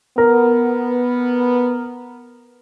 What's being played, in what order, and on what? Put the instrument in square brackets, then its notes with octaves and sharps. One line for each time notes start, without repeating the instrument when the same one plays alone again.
[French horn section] B3 [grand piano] A#4